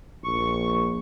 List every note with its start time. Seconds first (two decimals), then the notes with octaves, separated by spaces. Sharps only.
0.24 A#1 C#6